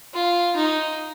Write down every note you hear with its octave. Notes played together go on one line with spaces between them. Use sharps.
F4
D#4